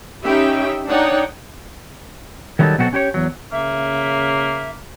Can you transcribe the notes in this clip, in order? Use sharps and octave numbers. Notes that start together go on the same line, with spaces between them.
C#4 D#4 G4 E5 G5 B5
D4 D#4 C#5 D5 F#5 G5
D#3 F#3 G3 C#4 D#4 A4
B2 F#3 C4 F#4 G4 A4
C#4 G4 B4 C#5
E2 F#3
C#3 A#3 E5